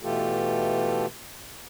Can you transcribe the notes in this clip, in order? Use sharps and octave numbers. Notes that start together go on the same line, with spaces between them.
B2 E3 A3 F4 G4 A4